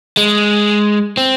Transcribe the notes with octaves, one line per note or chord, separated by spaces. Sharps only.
G#3
C4